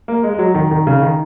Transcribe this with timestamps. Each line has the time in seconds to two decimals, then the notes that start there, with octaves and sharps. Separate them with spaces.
0.08 A#3
0.23 G#3
0.34 G#3
0.39 F#3
0.55 D#3
0.71 D#3
0.87 C#3
1.02 D#3